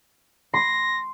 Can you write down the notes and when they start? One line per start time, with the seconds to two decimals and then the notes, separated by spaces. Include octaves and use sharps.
0.54 C6 A#6